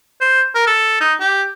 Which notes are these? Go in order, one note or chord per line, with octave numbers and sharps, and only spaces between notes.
C5
A#4
A4
D#4
G4